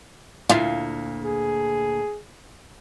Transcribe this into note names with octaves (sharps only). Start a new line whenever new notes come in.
D2 A#2 E4 F4 F5
G#4